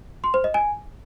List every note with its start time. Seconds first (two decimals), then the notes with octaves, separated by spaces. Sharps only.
0.24 C6
0.34 C5
0.44 D#5
0.54 G#5